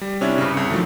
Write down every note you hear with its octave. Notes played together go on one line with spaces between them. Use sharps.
G3
C3 C#4 D4 E4
G2 C#3
C2 C#7
D#3 F3 F#3 A3